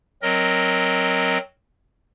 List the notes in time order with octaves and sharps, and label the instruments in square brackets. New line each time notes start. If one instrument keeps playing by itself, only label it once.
[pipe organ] F#3 C4 A#4 D#5